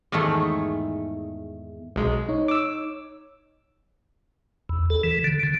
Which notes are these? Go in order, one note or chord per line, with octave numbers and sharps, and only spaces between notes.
E2 G#2 D#3 A3 G#4 A4
B1 G#3
D#4 C#5
D6 E6
E2
A4
E3
D3
D3